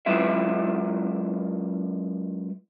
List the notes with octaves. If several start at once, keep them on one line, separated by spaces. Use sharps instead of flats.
F#2 F#3 G#3 E4 F4 E5